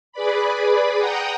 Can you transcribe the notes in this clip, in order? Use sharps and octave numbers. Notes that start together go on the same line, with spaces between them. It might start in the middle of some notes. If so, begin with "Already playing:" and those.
G#4 B4 D5 B5
F#5 G5 A#5 D#6